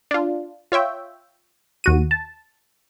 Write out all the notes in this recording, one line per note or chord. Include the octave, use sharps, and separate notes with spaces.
D4 F4
F4 C#5 E5 G5
D#2 F#4 D#7
A5